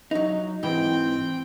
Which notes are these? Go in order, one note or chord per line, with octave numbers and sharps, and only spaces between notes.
F#3 D#4
G#2 E3 C4 G5